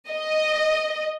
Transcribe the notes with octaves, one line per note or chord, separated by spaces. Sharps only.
D#5